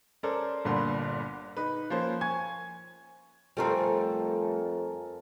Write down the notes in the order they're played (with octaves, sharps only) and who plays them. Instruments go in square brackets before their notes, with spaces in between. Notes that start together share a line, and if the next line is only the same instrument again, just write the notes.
[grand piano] C#4 A4 A#4 C5 D5
G1 G2 A#2 D3 B3 C6
D#4 B4
F3 A#3 C#4 C5
G#5 C#6 G#6
[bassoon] F2 [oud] G3 A3 C4 [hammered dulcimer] A4 A#4 G#5